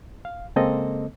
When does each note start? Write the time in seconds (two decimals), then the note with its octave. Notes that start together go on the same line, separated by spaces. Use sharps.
0.25 F5
0.56 C#3 G#3 A#3 C4 A4 D#5